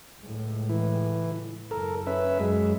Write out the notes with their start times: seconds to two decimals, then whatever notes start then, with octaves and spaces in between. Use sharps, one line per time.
0.20 C#2 A2
0.69 E3
1.71 F#1 A4 A#4
2.07 C#4 B4 E5
2.40 F#2 G#3